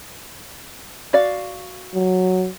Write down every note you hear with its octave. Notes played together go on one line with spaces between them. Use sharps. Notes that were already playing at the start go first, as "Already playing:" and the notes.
F#4 D5 F5
F#3